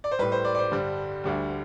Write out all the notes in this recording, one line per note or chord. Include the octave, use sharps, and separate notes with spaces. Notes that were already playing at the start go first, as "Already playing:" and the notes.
D5
C5
A2 G3 B4
C5
D5
D5
C5
G2 D3 G3
D2 D3 G3